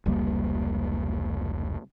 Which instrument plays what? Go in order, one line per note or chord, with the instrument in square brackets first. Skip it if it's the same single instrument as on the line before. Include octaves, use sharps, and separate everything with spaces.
[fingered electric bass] F1 C#2 G3 A#3